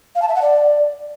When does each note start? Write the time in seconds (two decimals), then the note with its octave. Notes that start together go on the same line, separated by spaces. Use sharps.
0.15 F5
0.22 A5
0.29 E5
0.35 F#5
0.42 D5